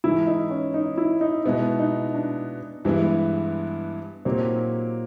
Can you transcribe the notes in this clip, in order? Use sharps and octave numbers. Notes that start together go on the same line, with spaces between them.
G#2 E3 G#3 E4
D#4
C#4
D#4
E4
D#4
B2 G#3 B3 D#4 E4
D#4
D4
G2 E3 G#3 B3 E4
A#2 F#3 A#3 C4 D#4 G4